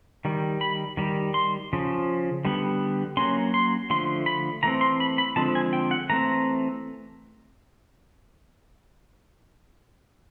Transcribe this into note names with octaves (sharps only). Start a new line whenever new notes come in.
D#3 G3
B5
D#3 G3
C6
C#3 F3
D3 G3 B3
F#3 A#3 C#4 C6
C6
D3 F3 A3 C6
B5
E3 A3 C4 A#5
C6
B5
B5
D3 F3 G#3 C4 A5
G#5
G5
F#5
E3 A3 C4 A#5